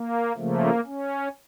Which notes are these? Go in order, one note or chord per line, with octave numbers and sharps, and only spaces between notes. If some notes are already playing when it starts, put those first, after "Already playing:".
Already playing: A#3
C#3 F3 A3 A#3
C#4